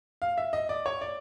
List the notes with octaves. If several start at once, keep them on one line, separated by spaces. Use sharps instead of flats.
F5
E5
D#5
D5
C#5
D5